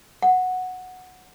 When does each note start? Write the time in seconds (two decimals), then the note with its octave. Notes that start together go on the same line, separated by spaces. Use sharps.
0.22 F#5